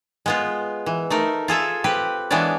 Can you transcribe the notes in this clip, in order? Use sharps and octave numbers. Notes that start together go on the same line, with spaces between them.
G#3 B3 F4
E3
A3 D#4 A#4
F4 G#4 A4 E5
C4 G4 B4
E3 G#3 B3 D4 C#5 D5